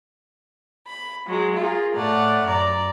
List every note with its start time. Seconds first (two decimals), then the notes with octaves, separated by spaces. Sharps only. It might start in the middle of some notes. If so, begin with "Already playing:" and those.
0.87 B5
1.25 F#3 G#3
1.56 F4 G#4 A#4
1.94 A2 A3 D5 F#5 F6
2.45 F#2 D5 A#5